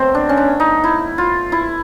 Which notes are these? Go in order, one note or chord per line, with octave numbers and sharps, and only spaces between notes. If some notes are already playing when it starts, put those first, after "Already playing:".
Already playing: B2 F#3 A3 C4
D4
C#4
D4
D#4
E4
F4
E4